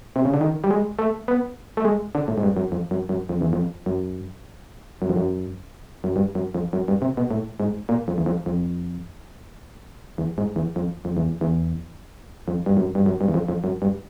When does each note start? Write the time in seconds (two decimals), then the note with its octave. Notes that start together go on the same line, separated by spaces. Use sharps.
0.16 C3
0.25 C#3
0.34 D3
0.41 D#3
0.64 G3
0.71 G#3
0.99 A3
1.28 B3
1.77 A3
1.85 G#3
2.15 D3
2.28 A2
2.38 G#2
2.43 G2
2.57 F#2
2.72 F2
2.91 F#2
3.09 F#2
3.29 F2
3.41 E2
3.53 F2
3.86 F#2
5.02 F#2
5.09 F2
5.16 F#2
6.04 F#2
6.16 G2
6.35 F#2
6.55 F2
6.73 F#2
6.88 G2
7.02 C3
7.17 B2
7.31 A2
7.60 G#2
7.89 A#2
8.08 F2
8.18 E2
8.26 F2
8.46 F2
10.18 E2
10.38 G#2
10.56 E2
10.76 F2
11.05 F2
11.17 E2
11.41 E2
12.48 F2
12.66 G2
12.77 F#2
12.95 G2
13.06 F#2
13.21 G2
13.28 E2
13.34 F2
13.49 F2
13.64 F#2
13.82 G2